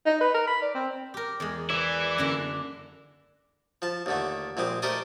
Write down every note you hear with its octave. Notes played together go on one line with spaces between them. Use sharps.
D#4
B4
A#4
B5
D5
C4
G4 A#4
E2 G#3
E3 E4 D5
F#2 D3 A#3
F3 A5
D#2 D3 A3
A#1 G#3 C4 G4
A3 G4 A#4 C5 D5 D#5